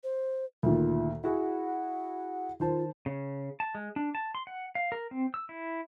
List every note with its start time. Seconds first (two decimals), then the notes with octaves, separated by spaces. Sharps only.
0.04 C5
0.63 D2 A#2 D#3 F4
1.24 E4 F#4 G#4 F#5
2.60 D#3 F4 C5 A5
3.06 C#3
3.60 A5
3.75 G#3
3.96 D4
4.15 A5
4.35 C6
4.47 F#5
4.75 F5
4.92 A#4
5.11 C4
5.34 E6
5.49 E4